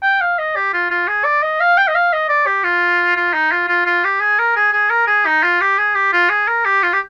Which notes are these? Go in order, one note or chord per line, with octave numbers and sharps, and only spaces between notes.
G5
F5
D#5
G4
F4
F4
G#4
D5
D#5
F5
G5
D#5
F5
D#5
D5
G4
F4
F4
D#4
F4
F4
F4
G4
G#4
A#4
G#4
G#4
A#4
G#4
D#4
F4
G4
G#4
G4
F4
G#4
A#4
G4
F4
G4